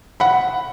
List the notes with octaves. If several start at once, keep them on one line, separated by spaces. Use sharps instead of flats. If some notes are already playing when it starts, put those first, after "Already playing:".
F#5 B5